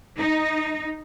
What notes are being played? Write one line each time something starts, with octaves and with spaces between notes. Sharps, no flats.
D#4